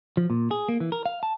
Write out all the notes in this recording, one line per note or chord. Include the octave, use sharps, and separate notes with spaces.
F3
A#2
G#4
A#3
E3
A#4
F5
A5